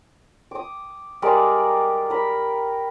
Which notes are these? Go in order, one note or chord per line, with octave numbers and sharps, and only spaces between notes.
D6 D#6
G3 G#3 A#4 D5
A#4 B5